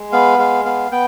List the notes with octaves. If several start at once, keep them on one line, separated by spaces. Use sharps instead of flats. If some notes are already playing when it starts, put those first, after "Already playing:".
Already playing: G#3
B3 F5
G#3 F5
B3 F5
B3 G5